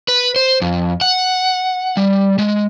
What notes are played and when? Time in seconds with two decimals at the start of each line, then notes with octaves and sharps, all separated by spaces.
0.08 B4
0.36 C5
0.62 F2
1.01 F#5
1.97 G3
2.38 G#3